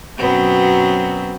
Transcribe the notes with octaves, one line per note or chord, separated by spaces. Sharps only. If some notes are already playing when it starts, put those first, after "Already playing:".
F#2 B2 F#3 B3 C4